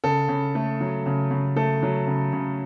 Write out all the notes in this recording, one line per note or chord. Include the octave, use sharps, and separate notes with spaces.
C#3 A4
C#3
A3
F#3
C#3
C#3
A3 A4
F#3
C#3
C#3